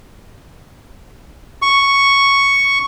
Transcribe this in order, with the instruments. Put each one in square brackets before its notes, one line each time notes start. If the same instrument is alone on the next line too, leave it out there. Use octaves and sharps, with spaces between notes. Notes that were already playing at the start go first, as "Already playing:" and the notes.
[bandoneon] C#6